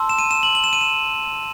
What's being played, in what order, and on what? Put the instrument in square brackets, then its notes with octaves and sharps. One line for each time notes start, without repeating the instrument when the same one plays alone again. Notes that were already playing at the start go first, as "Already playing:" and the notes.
Already playing: [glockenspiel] A5 C6 E6
E7
D#7
E7
F#7
F#7
E7
D#7
E7